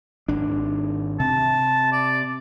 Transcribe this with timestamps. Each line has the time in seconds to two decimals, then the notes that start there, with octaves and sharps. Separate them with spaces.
0.28 G#1 D4
1.20 C3 A5
1.92 D5